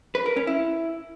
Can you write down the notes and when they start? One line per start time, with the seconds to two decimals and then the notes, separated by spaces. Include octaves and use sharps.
0.15 B4
0.26 A#4
0.36 C#4
0.47 E4